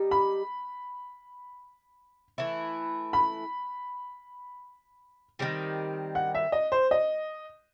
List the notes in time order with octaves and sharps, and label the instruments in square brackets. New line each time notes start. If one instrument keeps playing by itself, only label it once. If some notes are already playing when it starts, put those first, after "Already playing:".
Already playing: [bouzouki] G3 D#4 G4
[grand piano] B5
[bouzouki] E3 A3 E4
[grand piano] B5
[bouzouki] D#3 G3 C4
[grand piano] F#5
E5
D#5
C5
D#5